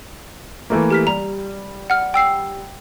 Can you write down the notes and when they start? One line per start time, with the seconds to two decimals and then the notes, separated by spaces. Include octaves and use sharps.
0.70 E3 A3 A#3
0.90 G4 F6 B6
1.07 G3 A#5
1.90 F#5 F6
2.14 G5 E6 C7